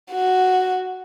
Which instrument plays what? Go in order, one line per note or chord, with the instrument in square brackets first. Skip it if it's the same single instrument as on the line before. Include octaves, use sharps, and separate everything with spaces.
[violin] F#4